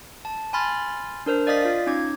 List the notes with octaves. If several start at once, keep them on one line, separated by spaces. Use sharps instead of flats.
A5
G#5 B5 C6 F6 A6
D4 A#4 C5
D5 D#5 F5 D#6 A6 B6
F4 F5
C#4 D#4 D6 G#6